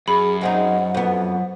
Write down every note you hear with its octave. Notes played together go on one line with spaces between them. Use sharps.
F#2 G#4 B5
G#3 C4 D#4 F#5
F2 B3